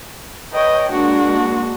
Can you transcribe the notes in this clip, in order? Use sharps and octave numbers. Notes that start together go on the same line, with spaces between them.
B4 C#5 D#5 G5
G#3 A#3 D4 F#4